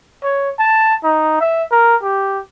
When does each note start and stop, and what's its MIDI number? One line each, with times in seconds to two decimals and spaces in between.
0.23 0.50 73
0.59 0.94 81
1.04 1.40 63
1.40 1.64 76
1.71 1.96 70
2.02 2.39 67